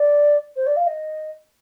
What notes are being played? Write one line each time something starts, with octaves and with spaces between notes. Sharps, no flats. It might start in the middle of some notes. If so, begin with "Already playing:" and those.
Already playing: D5
C5
D5
F5
D#5